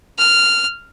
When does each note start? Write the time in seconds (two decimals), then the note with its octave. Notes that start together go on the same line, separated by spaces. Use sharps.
0.18 F6